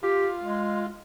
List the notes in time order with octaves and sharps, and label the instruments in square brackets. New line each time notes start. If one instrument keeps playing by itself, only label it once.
[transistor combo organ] F4 [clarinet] G4
[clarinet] G#3